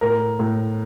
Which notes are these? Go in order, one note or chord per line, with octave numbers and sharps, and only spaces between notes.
A2 A#4
A2